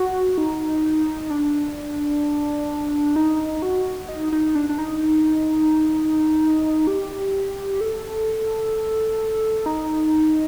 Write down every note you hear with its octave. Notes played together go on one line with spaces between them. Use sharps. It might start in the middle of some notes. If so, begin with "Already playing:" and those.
Already playing: F#4
D#4
D4
D#4
F#4
D#4
D#4
D4
D4
D#4
G4
A4
D#4